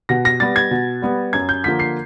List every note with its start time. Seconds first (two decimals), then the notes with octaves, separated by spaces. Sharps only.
0.09 B2 A#6
0.25 A#6
0.40 G3 B3 A6
0.56 G#6
0.71 B2
1.02 G3 B3
1.33 F#2 G#6
1.49 G6
1.64 D3 F3 A#3 B6
1.79 C7